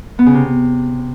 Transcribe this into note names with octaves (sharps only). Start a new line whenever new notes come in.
B3
C#3
C3